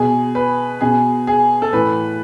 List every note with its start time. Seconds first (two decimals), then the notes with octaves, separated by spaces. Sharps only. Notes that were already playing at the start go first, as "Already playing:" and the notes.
Already playing: B2 G#4
0.35 B4
0.81 B2 G#4
1.27 G#4
1.62 A4
1.73 A2 E3 B4